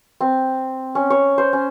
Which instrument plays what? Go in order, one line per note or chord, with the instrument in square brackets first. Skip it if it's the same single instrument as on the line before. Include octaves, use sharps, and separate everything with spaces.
[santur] C4
C#4
C#5
C5
C#4